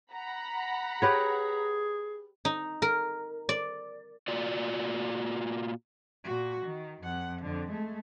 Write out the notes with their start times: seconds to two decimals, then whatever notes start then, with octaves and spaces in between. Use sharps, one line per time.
0.12 F#5 A#5 B5
1.02 G4 G#4 B4 C#5
2.45 D#4
2.82 A#4
3.49 D5
4.28 A#2 F4 F#4 D5
6.25 A#2 F#4
6.65 D#3
7.02 F2 F#5
7.42 F2 D3
7.70 G#3 A3